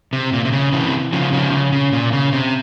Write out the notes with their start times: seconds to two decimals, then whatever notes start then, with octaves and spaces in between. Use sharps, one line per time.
0.13 C3
0.33 A#2
0.45 C3
0.52 C#3
0.73 C3 E3
1.13 C#3 F3
1.33 C#3 F3
1.52 C#3
1.72 C#3
1.93 A#2
2.13 C#3
2.32 C3